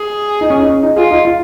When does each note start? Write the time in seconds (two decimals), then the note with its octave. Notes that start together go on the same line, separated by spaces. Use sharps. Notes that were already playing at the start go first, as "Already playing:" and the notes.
Already playing: G#4
0.41 D#4
0.50 C#4
0.59 D#4
0.69 C#4
0.83 D#4
0.96 F4 G#4
1.11 D#4
1.25 F4